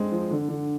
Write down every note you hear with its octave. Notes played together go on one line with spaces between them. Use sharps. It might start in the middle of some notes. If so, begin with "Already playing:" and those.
Already playing: G#3 C4 D4
F3
D3
D3